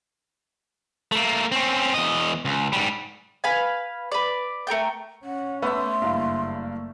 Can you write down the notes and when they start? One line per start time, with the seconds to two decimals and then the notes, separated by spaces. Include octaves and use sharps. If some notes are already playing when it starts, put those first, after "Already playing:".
1.12 A3 A#3
1.52 C4 C#4
1.94 E2 D#5
2.45 C#2
2.73 G#2 G3
3.44 B4 F5 G#5
4.12 B4 D5
4.67 A3 A#4 G5 G6
5.25 C#4 F#5
5.62 A3 B3 E5 C6
6.02 F#1 G2 A#3 E4 F5